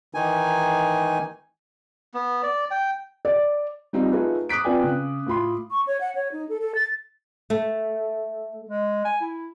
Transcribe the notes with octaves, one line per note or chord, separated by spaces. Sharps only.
D#3 E3 D#4 G#5
B3
D5
G5
D5
G3 C4 D#4 F4
A3 D#4 F4 G#4 A4 B4
D6 D#6 F#6 B6 D7
C4 F4 B4 D5 G5 G#5
C#3
A2 F4 B5 C6
C#6
C#5
F#5
C#5
D#4
A4
A4
A6
A3
G#3
G#5
E4